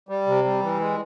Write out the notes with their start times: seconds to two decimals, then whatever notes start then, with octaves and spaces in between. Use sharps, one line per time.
0.09 G3
0.27 C3
0.44 G3
0.62 E3
0.80 G#3